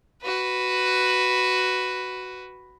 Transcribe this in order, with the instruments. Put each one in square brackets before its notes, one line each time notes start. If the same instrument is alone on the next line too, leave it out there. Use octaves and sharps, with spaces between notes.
[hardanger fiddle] F#4 B4